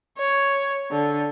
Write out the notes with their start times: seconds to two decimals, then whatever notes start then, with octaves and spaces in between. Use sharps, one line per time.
0.18 C#5
0.92 D3